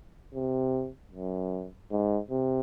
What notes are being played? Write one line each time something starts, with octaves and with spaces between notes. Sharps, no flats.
C3
F#2
G#2
C3